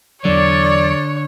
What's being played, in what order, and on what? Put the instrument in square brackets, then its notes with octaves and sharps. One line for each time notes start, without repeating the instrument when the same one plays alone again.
[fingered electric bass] E2 F#3 [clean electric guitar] D3 [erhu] C#5 [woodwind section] D5